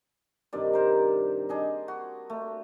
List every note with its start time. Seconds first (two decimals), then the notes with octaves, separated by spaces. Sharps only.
0.53 G2 C3 D#3 D5
0.73 A#4 C5 A#5
1.49 D4 G#4 D#5
1.88 F#4
2.30 A3